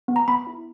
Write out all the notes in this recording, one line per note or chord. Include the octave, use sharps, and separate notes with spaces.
B3
A#5
B3 B5
E4